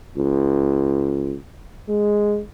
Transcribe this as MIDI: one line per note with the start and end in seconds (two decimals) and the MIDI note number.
0.17 1.35 37
1.89 2.40 56